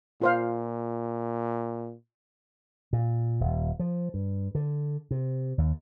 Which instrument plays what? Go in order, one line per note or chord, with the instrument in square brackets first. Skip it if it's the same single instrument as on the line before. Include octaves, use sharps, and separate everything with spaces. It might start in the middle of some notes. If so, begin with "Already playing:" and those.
[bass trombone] A#2 [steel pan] F4 C5 F5
[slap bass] A#2
D#1
F3
G2
D3
C3
D#2